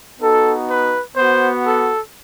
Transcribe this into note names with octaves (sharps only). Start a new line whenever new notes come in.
B3 D#4 F#4 A4
B4
B3 F#4 C5
A4